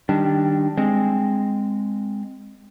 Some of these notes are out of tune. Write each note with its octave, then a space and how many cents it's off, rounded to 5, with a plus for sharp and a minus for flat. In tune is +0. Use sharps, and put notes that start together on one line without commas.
D#3 -10 G3 +0 D4 +0
G#3 -10 C4 +0